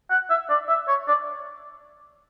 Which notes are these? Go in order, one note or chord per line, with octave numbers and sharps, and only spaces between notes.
F#5
E5
D5
E5
C#5
D5